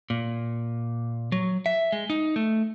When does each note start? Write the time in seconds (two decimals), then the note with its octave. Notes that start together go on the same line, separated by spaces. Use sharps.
0.10 A#2
1.32 F#3
1.66 E5
1.92 G#3
2.10 D#4
2.36 A3